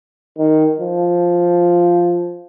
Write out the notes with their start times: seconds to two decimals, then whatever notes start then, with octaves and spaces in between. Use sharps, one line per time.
0.38 D#3
0.80 F3